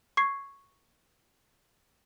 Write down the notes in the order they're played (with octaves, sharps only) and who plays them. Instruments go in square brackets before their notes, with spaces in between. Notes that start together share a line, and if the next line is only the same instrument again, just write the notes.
[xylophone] C#6 G#6 C7